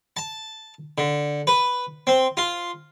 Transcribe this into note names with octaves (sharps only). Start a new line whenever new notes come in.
A5
D3
B4
C4
F4